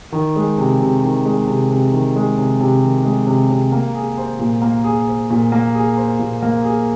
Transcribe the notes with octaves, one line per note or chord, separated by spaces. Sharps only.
D#3
G#3
C3
C3
D#3
G#3
C3
C3
D#3
G#3
C3
C3
D#3
G#3
C3
C3
A#3
G#4
C5
A#2
A#3
G#4
C5
A#2
A#3
G#4
C5
A#2
A#3
G#4